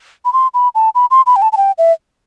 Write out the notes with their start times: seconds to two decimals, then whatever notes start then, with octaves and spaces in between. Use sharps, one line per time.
0.25 B5
0.33 C6
0.54 B5
0.75 A5
0.95 B5
1.11 C6
1.26 B5
1.36 G5
1.42 A5
1.52 A5
1.57 G5
1.78 E5